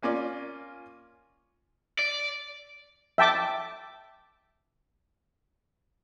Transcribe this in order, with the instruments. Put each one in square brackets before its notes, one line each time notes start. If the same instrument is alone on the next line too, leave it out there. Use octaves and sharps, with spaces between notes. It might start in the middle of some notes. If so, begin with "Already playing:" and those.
[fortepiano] A#3 C#4 F4 D5
[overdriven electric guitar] D5
[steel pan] E5 G5 A5 D6